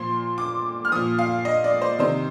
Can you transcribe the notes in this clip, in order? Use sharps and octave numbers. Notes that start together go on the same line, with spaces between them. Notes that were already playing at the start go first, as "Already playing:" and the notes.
Already playing: A#2 F3 C6
D6
F6
A#2 F3 D#6
F5
D#5
D5
C5
C3 D#3 C5